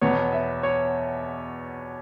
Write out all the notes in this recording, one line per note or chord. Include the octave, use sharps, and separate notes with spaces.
E2 B2 B3 C#5
E5
C#5